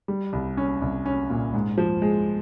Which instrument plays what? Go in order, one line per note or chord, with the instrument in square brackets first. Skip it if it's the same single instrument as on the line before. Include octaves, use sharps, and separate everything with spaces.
[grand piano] G3
C2
C#4
C2
C#4
A#2
G#2
F3
G#3